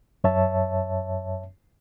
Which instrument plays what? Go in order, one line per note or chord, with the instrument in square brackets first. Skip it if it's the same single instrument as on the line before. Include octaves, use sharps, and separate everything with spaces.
[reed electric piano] F#2 C#5 E5 A5